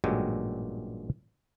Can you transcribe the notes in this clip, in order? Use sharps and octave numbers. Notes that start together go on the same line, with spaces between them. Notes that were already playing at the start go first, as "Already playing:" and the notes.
A1 G2 A#2 F#3 G#3 G4